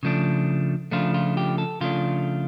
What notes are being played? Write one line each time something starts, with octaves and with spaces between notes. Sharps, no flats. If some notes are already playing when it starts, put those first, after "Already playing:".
C#3 F3 A3 D4
C#3 F3 A3 D4 F4
F4
G4
A4
C#3 F3 A3 D4 F4